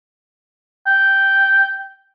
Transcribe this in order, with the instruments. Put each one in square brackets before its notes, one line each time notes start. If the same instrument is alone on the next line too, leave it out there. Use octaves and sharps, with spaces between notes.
[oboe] G5